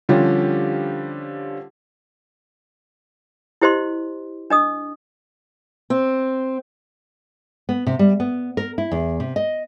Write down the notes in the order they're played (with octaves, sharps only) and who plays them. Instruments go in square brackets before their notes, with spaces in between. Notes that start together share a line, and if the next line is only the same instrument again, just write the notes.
[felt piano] D3 F3 G3 C#4 F4 G4
[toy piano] E4 G4 C5 D#5 C6
D4 D#5 D#6
[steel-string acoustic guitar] C4
[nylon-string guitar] B3
C3
G3
B3
A#4
E4
E2
C3
D#5